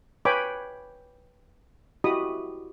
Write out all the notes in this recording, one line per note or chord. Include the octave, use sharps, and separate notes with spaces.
B4 C#5 G5 G#5 B5 D6
E4 F#4 G4 D#5 B5 D#6